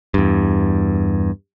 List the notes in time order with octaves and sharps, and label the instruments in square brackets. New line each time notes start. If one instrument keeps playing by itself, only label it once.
[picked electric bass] E2 G2